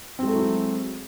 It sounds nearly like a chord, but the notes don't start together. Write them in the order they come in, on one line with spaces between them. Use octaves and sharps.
C4 G#3 A3 F#3 E4